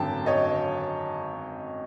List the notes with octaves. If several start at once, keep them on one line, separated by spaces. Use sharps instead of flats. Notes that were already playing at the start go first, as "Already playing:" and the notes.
Already playing: G#1 F#2 D3 G5 A5
C#5 D#5